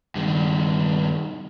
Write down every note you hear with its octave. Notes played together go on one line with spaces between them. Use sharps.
G2 D#3